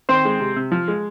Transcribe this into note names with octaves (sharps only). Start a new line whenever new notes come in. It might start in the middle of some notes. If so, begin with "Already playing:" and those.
D#3 C4 C5
G#3
C3
C3
F3
G#3